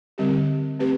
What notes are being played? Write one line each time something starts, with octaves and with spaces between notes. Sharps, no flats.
D3 G3 C4 G4
A3 C4 G4 B4